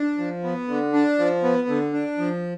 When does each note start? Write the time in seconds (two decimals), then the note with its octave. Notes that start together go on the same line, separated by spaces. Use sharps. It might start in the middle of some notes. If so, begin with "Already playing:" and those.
Already playing: D4
0.18 F3
0.44 B3
0.68 D3
0.93 D4
1.19 F3
1.43 B3
1.68 D3
1.93 D4
2.18 F3